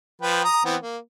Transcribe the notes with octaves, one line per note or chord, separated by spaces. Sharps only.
F3 B4 G5
A#5 D#6
E3 B3 C4
A#3